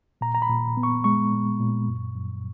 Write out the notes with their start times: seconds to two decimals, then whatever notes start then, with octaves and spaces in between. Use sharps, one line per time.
0.21 A#2 A#5
0.35 A#5
0.42 B5
0.49 A#2
0.77 B3
0.83 C#6
1.04 G#3 C#6
1.32 A#2
1.60 A#2
1.88 F#2
2.15 F#2